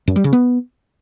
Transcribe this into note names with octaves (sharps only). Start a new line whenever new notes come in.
F#2
G3
C#3
B3